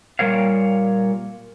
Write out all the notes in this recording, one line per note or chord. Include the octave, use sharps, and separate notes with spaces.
A#2 G3 A#4 C#5 F5